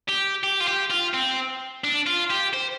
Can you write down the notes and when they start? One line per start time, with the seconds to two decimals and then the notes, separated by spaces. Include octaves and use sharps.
0.08 G4
0.43 G4
0.60 F4
0.67 G4
0.90 F4
1.14 C4
1.84 D4
2.07 F4
2.31 G4
2.54 C5